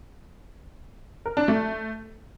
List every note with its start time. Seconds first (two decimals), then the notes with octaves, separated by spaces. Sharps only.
1.26 A#4
1.37 D4
1.48 A3